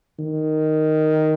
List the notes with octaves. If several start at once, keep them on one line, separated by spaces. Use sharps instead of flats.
D#3